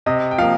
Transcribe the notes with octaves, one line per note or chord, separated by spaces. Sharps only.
C3 D#5
G5
F3 A#3 F5